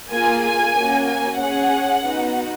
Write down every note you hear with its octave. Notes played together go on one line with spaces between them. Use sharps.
A#3 F4 G#4 G#5
G#5
A#3 C#4 F#4
G#5
C#4 G#4 F#5
B3 D#4 F#4